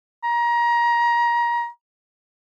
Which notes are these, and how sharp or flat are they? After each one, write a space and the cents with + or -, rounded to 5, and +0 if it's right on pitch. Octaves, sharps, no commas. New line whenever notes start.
A#5 +25